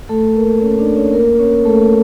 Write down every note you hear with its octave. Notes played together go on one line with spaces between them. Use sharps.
A3 A4
A#3 A#4
C#4 C#5
D4 D5
C#4 C#5
A#3 A#4
C#4 C#5
A3 A4